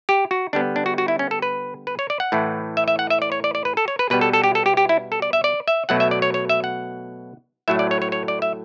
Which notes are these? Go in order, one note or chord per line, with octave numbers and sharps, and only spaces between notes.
G4
F#4
D3 G3 B3 D4
D4
F#4
F#4
E4
C#4
A4
B4
B4
C#5
D5
F#5
A2 E3 A3
E5
E5
F#5
E5
D5
C#5
D5
D5
B4
A4
C#5
B4
B2 G3 B3 B4
A4
A4
G4
A4
G4
G4
E4
A4
D5
E5
D5
E5
B2 F#3 A3 F#5
E5
D5
C#5
C#5
E5
F#5
A2 F#3 A3 E5
D5
C#5
C#5
C#5
D5
E5